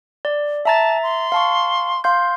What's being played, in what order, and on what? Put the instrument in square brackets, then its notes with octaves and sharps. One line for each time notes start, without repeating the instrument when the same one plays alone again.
[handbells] D5
[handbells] E5 A#5 A6 [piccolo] A5
[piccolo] C6
[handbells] F5 A5 C#6
F5 C6 G6